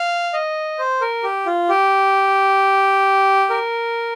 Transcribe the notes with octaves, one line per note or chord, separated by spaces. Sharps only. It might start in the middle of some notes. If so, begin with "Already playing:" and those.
Already playing: F5
D#5
C5
A#4
G4
F4
G4
A#4